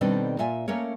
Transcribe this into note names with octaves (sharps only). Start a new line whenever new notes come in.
B2 D#3 G3 C4 D4 A4
A#2 F4 E5 G#5
A3 A#3 C#4 A#4 C#5